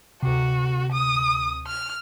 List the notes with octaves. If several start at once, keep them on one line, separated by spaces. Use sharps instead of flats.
D2 C3 F#4
D#6
F6